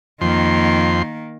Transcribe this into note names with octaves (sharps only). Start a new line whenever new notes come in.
F2 D#3 A#3 C6